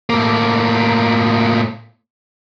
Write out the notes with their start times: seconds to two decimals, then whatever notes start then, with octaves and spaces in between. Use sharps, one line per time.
0.10 A2 A#3